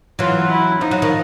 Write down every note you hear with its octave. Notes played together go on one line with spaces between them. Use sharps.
E3 F#3 F4
E4
F3 D#4
F#3
D#3 F3